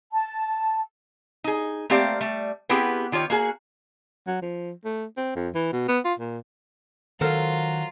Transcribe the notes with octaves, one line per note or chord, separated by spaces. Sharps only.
A5
D#4 G#4
A3 A#3 C4 G4 D5 F5
G3 A3
B3 C4 E4 G4 G#4 B4
D#3 F4 G4 C#5
A#3 F#4 G#4
F#3
F3
A3
C4
F2
E3
B2
B3
F4
A#2
D#3 F#3 F4 A4 A#4 C5